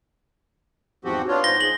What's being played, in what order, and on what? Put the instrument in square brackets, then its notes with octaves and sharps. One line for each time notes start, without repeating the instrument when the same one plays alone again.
[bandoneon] E2 G#2 F3 [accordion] C4 F#4 G4
[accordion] B3 F4 [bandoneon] D4 C#5
[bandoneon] G#2 C5 [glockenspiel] A#6 G7
[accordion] G#3 [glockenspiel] F#7